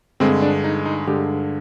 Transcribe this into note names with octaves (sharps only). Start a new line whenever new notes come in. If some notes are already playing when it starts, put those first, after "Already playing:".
G2 D3 G#3 C4
D4
D#4
D#4
G2 D3 G#3 G4